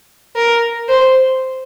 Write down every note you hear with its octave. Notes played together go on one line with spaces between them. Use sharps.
A#4
C5